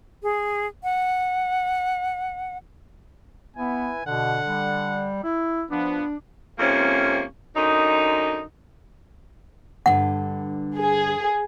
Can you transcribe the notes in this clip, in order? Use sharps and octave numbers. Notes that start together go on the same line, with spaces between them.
G#4
F#5
B3 E4 B4 G#5
B2 D3 F#5
G3
E4
F3 B3 D4
F2 G#2 C3 A#3 C#4
F#2 D3 D#4
G2 D3 F#5
G#4